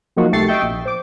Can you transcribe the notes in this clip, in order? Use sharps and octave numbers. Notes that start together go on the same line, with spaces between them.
F3 F#3 A#3 D#4 F4 F#4
C2 A3 G4 C#6 A6 C7
D#5 E5 G5 C#6
A#1
C5 D6